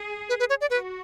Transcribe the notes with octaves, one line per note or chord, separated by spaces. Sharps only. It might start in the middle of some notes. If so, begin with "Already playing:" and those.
Already playing: G#4
B4
B4
C#5
D5
F#4 B4